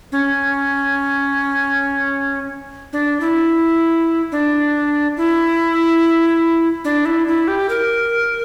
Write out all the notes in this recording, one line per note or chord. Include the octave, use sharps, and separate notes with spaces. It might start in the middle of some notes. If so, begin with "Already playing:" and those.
C#4
D4
E4
D4
E4
D4
E4
E4
G4
A#4